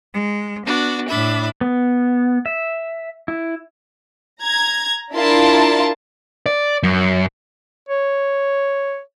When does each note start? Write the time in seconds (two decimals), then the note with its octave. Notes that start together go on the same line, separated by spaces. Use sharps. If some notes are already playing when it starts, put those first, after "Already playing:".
0.14 G#3
0.66 B3 D4 F#4
1.08 A2 D4 E5 B5
1.61 B3
2.46 E5
3.28 E4
4.42 A#5 G#6
5.14 D4 E4 F4 A#4 A5 C6
6.46 D5
6.83 F#2
7.89 C#5